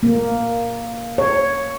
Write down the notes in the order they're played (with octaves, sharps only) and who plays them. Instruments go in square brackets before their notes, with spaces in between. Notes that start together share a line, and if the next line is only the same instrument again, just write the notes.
[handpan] A#3
C#5